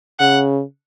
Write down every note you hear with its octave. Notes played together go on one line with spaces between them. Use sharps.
C#3 F#5